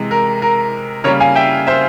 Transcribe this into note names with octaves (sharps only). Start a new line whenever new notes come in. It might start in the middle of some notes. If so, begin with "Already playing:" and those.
Already playing: C3 E3 G#3
A#4
A#4
C#3 G3 A#3 A#4 C#5
F5 G#5
E5 G5
C5 E5